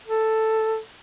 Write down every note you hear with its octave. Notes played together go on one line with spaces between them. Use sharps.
A4